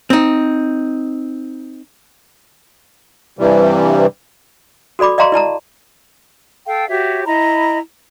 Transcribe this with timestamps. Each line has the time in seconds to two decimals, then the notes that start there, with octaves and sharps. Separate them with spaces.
0.10 C4 D#4
3.39 G2 C3 E3 G3
4.99 F#4 A4 D5 B5 D6
5.18 D5 D#5 F5 A#5 C6 C#6
5.32 E4 D5 A5 A#5
6.66 A4 F5 G5
6.88 F#4 G4 C#5 E5
7.25 E4 D#5 A#5 B5